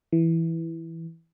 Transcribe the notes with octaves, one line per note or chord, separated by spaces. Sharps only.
E3